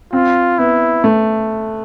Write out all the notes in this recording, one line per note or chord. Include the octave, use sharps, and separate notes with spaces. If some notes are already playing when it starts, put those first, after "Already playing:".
C4 F4
B3 E4
A3